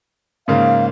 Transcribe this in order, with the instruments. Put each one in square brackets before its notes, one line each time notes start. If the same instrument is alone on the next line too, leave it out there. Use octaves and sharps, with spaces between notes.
[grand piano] G#2 C#3 A#3 [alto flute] F5